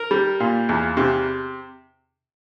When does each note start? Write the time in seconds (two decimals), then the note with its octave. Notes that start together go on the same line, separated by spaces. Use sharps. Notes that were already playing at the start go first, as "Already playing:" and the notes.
Already playing: A#4
0.11 G3
0.40 A#2
0.69 E2
0.97 C3